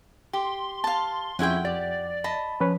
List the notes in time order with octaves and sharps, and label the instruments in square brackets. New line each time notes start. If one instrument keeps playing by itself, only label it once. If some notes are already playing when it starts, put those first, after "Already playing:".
[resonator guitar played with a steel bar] G4 [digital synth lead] C6
[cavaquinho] F5 A5
[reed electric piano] F2 [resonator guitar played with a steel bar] C#4 E4 G#4 [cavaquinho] F#5 G5
[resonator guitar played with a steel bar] G4 [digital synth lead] D5
[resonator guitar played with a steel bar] D#5 [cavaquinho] A5 B5
[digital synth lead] F3 [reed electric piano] C#4 B4 C#5